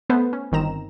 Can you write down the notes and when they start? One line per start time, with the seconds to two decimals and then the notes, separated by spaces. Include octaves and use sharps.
0.10 A3 B3 A4 B4 C5
0.33 C#4
0.52 G1 D#3 C4 A#5 E7